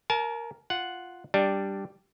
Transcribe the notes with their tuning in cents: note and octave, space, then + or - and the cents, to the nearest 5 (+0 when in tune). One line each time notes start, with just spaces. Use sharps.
A#4 +0 A5 -45
F4 +0 F#5 +0
G3 +0 D4 +0